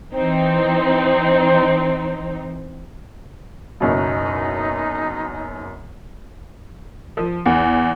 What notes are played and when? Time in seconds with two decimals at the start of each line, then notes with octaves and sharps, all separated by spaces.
0.15 E3 C4 D#4
3.80 F#1 F#2 B2 D#4
7.17 F3
7.46 E2